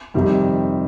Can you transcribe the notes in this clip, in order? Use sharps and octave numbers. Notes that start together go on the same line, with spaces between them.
F2 C3 D#3 G3